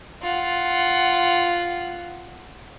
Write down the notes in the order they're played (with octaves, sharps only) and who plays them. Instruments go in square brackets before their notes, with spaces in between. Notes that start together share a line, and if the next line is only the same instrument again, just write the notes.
[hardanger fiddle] F4 F#5